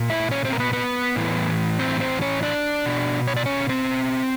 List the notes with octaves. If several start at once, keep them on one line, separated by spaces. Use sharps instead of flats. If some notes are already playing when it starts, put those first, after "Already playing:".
Already playing: A#2
E4 E5
C#4 C#5
C4 C5
A#4
B3 B4
B3 B4
A2 E3
C4 C5
C4 C5
C#4 C#5
D4 D5
B2
C#5
D5
C#4 C#5
C4 C5